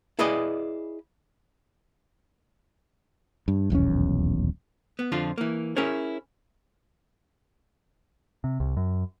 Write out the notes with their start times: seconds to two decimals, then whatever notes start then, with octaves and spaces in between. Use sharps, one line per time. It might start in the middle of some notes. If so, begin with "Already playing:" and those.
0.19 E4 G#4 B4 D5 D#5
3.48 G2
3.70 D#1 B1 E2 C#4
4.99 B3
5.12 F2 D3 F3 F4
5.38 E3 A#3
5.77 C#4 E4 G#4 A#4 C#5
8.44 C3
8.60 C2
8.77 F#2